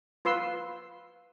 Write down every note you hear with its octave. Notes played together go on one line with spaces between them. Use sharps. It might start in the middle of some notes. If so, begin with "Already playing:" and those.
F4 B4 C6 E6